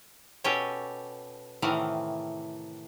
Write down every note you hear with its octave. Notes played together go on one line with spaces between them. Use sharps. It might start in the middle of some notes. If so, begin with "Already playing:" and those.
B2 C#4 G4 A4 C#5 G5
A2 C3 D#3 E3 F5 F#5